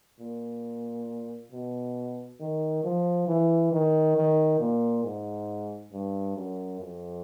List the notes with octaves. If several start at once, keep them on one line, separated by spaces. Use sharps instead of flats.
A#2
B2
D#3
F3
E3
D#3
D#3
A#2
G#2
G2
F#2
F2